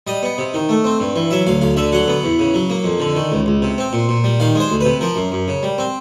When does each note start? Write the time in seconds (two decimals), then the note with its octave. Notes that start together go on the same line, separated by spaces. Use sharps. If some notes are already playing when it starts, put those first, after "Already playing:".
0.07 G3 D#5
0.23 B3
0.38 C3
0.54 D#3
0.69 A3
0.84 C4
1.00 G2
1.16 E3
1.31 F#3 E5
1.47 D2 F5
1.61 D2 F5
1.76 D3 E5
1.92 F#3 F#5
2.08 B3
2.24 E2
2.39 C#3
2.54 F#3
2.70 A#3
2.84 F2
3.00 D3
3.15 D#3
3.32 C#2
3.46 C#2
3.62 C3
3.78 C4
3.93 A#2
4.09 A#2
4.24 G3
4.40 D#3 F5
4.55 G#3 C5
4.70 D2
4.81 C3 B4
5.01 F3 A#4
5.16 F#2
5.32 F#2
5.48 C#3
5.63 G3
5.78 C4